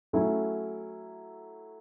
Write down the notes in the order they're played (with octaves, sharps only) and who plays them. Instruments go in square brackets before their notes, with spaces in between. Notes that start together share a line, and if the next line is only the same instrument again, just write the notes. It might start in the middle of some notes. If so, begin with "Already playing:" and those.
[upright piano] F#3 A3 C#4 E4